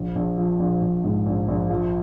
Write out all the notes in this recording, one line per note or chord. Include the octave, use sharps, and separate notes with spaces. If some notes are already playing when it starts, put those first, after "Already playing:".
Already playing: A#1
A#1
F3
A#1
A#1
G#2
A#1
A#1
F3